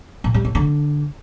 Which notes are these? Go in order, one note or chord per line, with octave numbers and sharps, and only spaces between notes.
A#2
G3
A2
D3